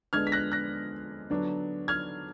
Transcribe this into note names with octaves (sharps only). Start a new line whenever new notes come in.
D3 G#3 B3 D4 F6 G#6
B6
F#6 A#6
F#6 A#6
D3 F#3 B3 D4
F6 G#6